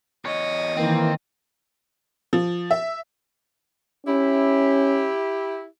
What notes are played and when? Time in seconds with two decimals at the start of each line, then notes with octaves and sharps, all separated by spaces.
0.25 E2 C#5 D#5
0.77 D#3 E3 A#3 C4
2.33 F3
2.71 E5
4.06 C#4 E4 G4